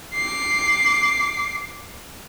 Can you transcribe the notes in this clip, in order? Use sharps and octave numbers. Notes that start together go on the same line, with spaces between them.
D6 C7